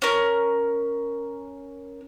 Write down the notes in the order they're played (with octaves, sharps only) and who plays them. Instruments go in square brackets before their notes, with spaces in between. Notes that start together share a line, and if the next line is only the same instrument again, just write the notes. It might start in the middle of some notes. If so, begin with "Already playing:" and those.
[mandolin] C#4 A#4